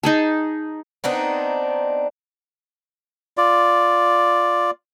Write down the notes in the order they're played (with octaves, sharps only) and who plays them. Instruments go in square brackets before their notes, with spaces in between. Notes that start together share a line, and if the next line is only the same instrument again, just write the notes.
[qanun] D#4 G#4 A5
[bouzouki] B3 C4 D4 D#4
[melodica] F4 D5